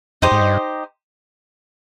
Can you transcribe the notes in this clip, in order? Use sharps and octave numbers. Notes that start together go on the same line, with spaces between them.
F2 D#4 G4 C5 D#5
G#2
G2